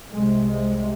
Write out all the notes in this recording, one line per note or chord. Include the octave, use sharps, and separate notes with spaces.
C2 C3 G#3
G#3